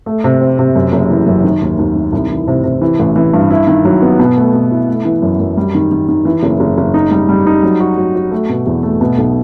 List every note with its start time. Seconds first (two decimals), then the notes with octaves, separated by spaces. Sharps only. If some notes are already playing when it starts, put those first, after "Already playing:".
0.06 A3
0.24 C3
0.41 C4
0.59 C3
0.75 F#2
0.93 F#1
1.10 E3
1.27 F#2
1.44 D#3
1.62 D#2
1.79 D#2
1.96 D#3
2.12 C2
2.30 E3
2.48 C3
2.64 C3
2.82 E3
2.99 A1
3.16 E3
3.33 G2
3.50 E4
3.67 D#3
3.85 F#3
4.02 B3
4.19 B2
4.37 A3
4.53 B2
4.71 E4
4.88 A3
5.05 E3
5.22 F#2
5.39 F#2
5.57 G3
5.75 D#3
5.91 D#3
6.08 D#3
6.25 E3
6.43 F#1
6.60 F#1
6.78 F#1
6.94 D#4
7.11 G3
7.29 G3
7.47 D#4
7.63 F#3
7.80 F#4
7.97 F#3
8.15 F#4
8.31 A3
8.49 B2
8.66 E2
8.83 A3
9.01 B2
9.18 B1